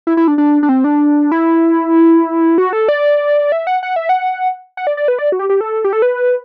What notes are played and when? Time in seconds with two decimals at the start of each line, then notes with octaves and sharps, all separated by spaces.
0.07 E4
0.17 E4
0.28 D4
0.38 D4
0.63 D4
0.69 C4
0.84 D4
1.32 E4
2.58 F#4
2.73 A4
2.88 D5
3.52 E5
3.67 F#5
3.83 F#5
3.96 E5
4.09 F#5
4.77 F#5
4.87 D5
4.97 D5
5.08 B4
5.19 D5
5.32 F#4
5.39 G4
5.50 G4
5.61 A4
5.84 G4
5.93 A4
6.02 B4